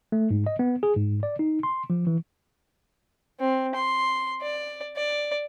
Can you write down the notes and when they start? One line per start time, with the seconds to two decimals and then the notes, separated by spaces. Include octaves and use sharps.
0.12 A3
0.31 G#2
0.47 D#5
0.59 B3
0.83 G#4
0.96 G#2
1.23 D5
1.39 D#4
1.63 C6
1.90 F3
2.07 E3
3.40 C4
3.75 C6
4.42 D5
4.97 D5